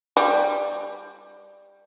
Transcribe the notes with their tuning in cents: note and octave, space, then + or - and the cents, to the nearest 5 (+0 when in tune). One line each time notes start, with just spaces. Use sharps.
G3 +15